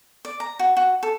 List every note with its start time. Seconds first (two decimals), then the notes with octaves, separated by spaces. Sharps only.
0.25 D5
0.40 A#5
0.59 F#4
0.77 F#4
1.03 A4